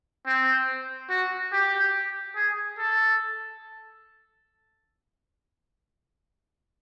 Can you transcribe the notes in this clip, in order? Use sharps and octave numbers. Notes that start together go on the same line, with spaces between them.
C4
F#4
G4
G#4
A4